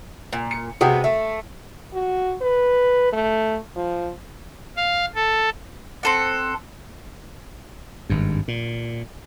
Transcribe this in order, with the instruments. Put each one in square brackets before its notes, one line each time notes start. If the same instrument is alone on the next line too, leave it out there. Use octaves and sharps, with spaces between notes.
[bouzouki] A#2
[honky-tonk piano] C#7
[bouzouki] C3 G#3 B3 [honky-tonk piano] F#4 G5 D#6
[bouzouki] A3 [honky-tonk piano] E5
[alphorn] F#4
B4
A3
F3
[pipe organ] F5
A4
[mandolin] C4 A4 F#5
[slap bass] G#1 G2
A#2